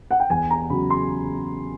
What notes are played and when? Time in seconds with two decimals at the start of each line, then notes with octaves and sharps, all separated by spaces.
0.11 F#5
0.20 G5
0.30 E2 G#5
0.50 A#5
0.70 C#3 F#3 B5
0.90 C6